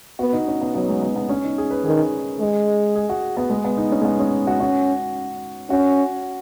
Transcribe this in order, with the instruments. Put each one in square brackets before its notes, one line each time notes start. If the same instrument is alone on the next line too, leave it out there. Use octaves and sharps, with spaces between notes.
[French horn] B3 [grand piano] F#4
[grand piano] D#4
C#4
B3
[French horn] F#3 [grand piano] B3
[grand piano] G#3
B3
B3
C#4
D#4
G#4
B4
[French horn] D#3 [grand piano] G#4
[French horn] G#3
[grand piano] G#4
F#4
B3
G#3
B3
D#4
C#4
G#3
B3
C#4
F#4
[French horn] C#4 [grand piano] F#4
[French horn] C#4 [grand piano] F#4